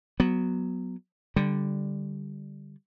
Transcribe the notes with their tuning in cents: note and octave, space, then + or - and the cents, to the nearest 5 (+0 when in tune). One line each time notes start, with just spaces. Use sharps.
F#3 +0 B3 +0
D3 +0 G3 +0